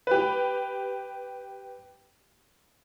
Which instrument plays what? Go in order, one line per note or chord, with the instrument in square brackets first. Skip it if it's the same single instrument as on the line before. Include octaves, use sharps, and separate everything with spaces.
[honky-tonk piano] G4 B4